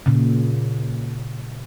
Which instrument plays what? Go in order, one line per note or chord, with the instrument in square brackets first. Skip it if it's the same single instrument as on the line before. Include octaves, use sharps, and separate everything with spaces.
[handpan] A#2 C#3